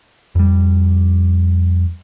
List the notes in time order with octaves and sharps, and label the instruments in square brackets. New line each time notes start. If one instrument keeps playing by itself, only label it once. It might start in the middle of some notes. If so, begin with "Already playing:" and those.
[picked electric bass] F2 G3